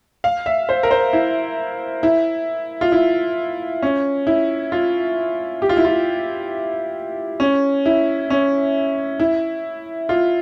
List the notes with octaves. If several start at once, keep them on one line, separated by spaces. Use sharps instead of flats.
F5
E5
C5
A#4
C5
E4
E4
F4
E4
C#4
E4
F4
G4
F4
E4
F4
C#4
E4
C#4
E4
F4